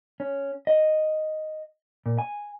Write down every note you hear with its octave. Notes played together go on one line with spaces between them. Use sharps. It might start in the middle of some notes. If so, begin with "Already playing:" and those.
C#4
D#5
A#2
G#5